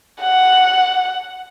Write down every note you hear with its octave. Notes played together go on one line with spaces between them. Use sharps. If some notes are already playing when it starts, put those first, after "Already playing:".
F#5